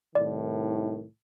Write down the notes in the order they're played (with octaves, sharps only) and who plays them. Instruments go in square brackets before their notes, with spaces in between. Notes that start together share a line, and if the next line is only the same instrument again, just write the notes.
[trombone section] C2 A2 D#3 [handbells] D5